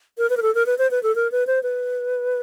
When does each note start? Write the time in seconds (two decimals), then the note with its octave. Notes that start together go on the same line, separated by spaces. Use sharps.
0.18 A#4
0.30 B4
0.37 A#4
0.42 A4
0.55 A#4
0.66 B4
0.78 C5
0.91 B4
1.03 A4
1.15 A#4
1.32 B4
1.47 C5
1.63 B4